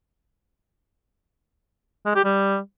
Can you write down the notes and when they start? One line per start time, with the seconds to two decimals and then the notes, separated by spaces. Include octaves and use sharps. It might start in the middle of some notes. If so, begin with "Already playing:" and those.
2.05 G#3
2.15 G4
2.24 G3